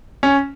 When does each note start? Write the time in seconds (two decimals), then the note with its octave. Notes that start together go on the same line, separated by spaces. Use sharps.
0.23 C#4